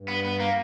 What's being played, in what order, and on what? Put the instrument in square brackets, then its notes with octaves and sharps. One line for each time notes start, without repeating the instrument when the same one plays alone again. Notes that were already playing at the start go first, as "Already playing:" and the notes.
Already playing: [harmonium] G2
[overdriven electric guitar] B3
B3
A#3